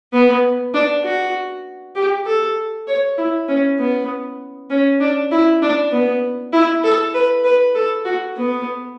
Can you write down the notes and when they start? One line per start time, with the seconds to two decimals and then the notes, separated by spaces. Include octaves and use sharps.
0.13 B3
0.74 D4
1.04 F#4
1.96 G4
2.26 A4
2.88 C#5
3.18 E4
3.49 C#4
3.78 B3
4.70 C#4
5.01 D4
5.32 E4
5.62 D4
5.92 B3
6.53 E4
6.84 A4
7.14 B4
7.44 B4
7.75 A4
8.05 F#4
8.37 B3